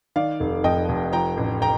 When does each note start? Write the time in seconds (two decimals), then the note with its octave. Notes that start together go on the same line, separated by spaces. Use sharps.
0.16 D#3 D5 F5
0.40 F1
0.64 F2 D#5 G5
0.89 F1
1.13 F3 G5 A#5
1.37 A1
1.62 G5 A#5